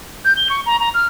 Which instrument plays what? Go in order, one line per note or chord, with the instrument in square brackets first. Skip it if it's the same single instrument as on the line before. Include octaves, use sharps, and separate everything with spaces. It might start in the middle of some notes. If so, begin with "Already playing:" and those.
[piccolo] G6
G7
C#6
A#5
A#5
F6